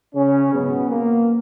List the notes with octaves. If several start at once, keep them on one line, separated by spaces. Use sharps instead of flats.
C#3 C#4
G#2 B2 F#3 B3
A#3